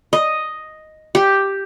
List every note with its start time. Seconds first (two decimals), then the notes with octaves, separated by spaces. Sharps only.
0.13 D#5
1.15 G4